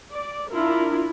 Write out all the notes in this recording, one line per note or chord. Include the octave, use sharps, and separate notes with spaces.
D5
D4 E4 F4 A#4